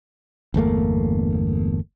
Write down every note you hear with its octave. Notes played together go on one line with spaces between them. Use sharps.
G1 E2 A3 A#3